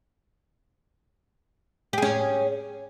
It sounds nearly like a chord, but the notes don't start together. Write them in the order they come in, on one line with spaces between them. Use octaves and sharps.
G4 G#4 C#4